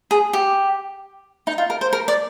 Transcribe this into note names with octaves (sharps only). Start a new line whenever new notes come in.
G#4
G4
D#4
F4
A#4
C5
A#4
D5